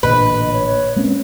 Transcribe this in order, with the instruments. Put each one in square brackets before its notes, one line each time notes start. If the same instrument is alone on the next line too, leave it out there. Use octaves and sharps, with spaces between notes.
[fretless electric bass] A1 A#2 D3 [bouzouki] B4 [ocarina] D#5
[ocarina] C#5
[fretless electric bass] G#3 A#3 C#4 [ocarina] C4